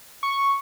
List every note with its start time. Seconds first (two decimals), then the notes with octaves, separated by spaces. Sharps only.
0.23 C#6